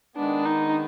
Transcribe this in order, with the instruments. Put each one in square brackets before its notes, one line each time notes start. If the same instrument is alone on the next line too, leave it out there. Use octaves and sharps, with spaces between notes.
[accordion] D#3 G#3 B3 [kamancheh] D4
[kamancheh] D#4